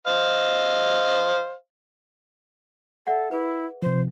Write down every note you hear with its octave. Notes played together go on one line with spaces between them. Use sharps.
C5 D#5 F5
A4 D5 E5 F#5
E4 G#4 A#4 B4
C3 F3 C5